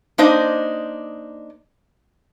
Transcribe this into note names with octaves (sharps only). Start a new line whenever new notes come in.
A#3 D4 D#4 C5 D#5